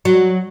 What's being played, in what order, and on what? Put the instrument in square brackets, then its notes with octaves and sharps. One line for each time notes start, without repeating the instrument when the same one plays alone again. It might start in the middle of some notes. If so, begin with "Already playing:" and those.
[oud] F#3